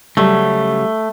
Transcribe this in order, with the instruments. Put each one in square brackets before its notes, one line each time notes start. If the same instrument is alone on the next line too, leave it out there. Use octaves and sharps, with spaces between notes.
[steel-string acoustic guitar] C#3 F#3 G3 [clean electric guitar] A3